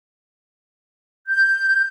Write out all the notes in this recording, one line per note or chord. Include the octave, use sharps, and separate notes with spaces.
G6